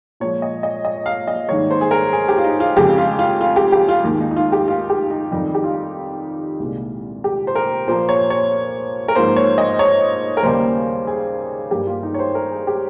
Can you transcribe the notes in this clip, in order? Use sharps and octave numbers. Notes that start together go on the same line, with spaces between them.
A#2 F3 G#3 C#5
D#5
D#5
D#5
F5
D#5
G#2 D#3 G3 A#3 C#5
C5
G#4
A#4
G#4
G4
F4
D#4
F4
F2 C#3 G#3 G4
F4
F4
F4
G4
G4
F4
D#2 D#3 G#3
D#4
D#4
F4
G4
F4
G4
D#4
F2 D#3 G3 D#4
G4
F4
C2 A#2 G#3
G4
C5
A#4
A#2 F3 A#3 C5
C#5
C#5
A#4
G#2 F3 A#3 C5
C#5
D#5
C#5
A#4
D#2 C#3 G3 A#3 C5
G#4
G2 G3 A#3 G4
F4
D#4
C#5
C5
A#4
G#4
G4